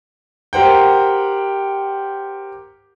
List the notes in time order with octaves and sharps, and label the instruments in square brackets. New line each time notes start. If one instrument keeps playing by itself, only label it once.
[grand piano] G4 A#4 C5 F#5 G5